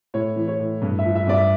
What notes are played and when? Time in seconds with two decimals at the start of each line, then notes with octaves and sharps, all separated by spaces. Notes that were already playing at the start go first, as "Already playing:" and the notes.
0.14 A2 C#5
0.36 E3
0.48 C#5
0.59 A2
0.82 G2
0.99 E5
1.05 F3
1.16 E5
1.27 G2 D5
1.33 E5